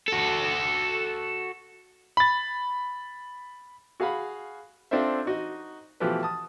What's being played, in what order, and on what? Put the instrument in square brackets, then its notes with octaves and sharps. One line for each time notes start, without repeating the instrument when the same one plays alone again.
[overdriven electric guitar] F#4 A4
[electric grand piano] B5 A6
[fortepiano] F#4 G#4 F5 F#5 B5
C4 D4 F4 A4 C5 E5
D#4 F#4 D#5
B2 E3 F3 A3 G4 B4
A5 D#6